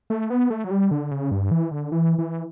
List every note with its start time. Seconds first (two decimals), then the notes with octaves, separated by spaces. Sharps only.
0.10 A3
0.30 B3
0.50 A3
0.64 F#3
0.71 G3
0.91 D3
1.11 C#3
1.31 G2
1.51 E3
1.71 D3
1.92 E3
2.18 E3